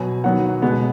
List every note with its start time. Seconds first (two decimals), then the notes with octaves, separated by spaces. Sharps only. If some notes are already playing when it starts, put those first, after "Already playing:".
Already playing: B2 F#3 B3 G#5
0.24 D#3 F#3 B3 F#5
0.62 B2 G#3 B3